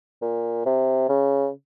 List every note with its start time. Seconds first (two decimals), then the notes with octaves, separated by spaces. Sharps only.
0.22 A#2
0.65 C3
1.09 C#3